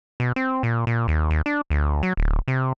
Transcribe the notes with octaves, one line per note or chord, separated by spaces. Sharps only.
B2
C4
A#2
A#2
D#2
D#2
D4
D2
F#3
D1
C3